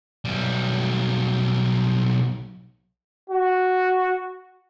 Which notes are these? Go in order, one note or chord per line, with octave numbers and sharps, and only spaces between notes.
B1 G3
F#4